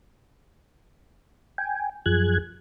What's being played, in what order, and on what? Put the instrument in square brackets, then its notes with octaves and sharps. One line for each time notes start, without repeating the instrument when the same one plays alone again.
[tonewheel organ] G5 G#5
F#2 F3 G#4 F#6 G#6